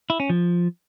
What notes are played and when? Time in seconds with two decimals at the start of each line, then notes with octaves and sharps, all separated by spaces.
0.10 E4
0.20 C#4
0.30 F3